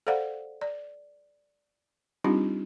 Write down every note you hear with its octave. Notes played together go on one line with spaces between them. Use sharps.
A4 C5 D5 F5 F#5
D5
G3 C4 D4 D#4 F4 G4